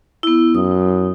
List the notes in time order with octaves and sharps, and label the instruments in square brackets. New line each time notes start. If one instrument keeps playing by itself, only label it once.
[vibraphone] B3 E4
[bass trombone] F#2 [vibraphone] D#6